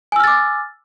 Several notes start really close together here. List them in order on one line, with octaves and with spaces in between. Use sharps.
G#5 E6 F6 A6 D6